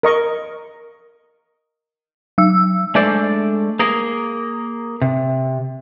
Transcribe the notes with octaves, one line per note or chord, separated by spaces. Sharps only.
A#4 D#5 C#6
F#3 E6
G#3 A3 D4 C5 D5
A#3 G#4 A#4
C3